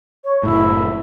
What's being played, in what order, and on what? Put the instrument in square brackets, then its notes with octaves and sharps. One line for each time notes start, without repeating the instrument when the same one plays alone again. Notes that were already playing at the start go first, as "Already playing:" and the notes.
[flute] C#5
[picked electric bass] F#1 A2 [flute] E4